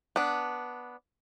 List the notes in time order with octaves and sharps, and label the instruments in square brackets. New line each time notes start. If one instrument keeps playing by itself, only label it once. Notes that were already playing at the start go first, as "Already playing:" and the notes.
[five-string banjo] B3 D4